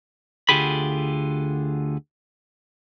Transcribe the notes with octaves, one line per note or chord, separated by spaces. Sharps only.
D2 D3 F4 G4 G#4 B5